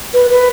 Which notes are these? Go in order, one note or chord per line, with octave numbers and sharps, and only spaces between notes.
B4
B4